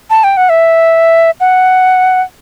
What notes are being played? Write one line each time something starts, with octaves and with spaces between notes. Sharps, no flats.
A5
G5
F#5
E5
F#5